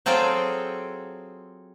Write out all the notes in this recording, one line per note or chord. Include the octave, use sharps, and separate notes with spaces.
F#3 C4 F4 G#4 A4 G5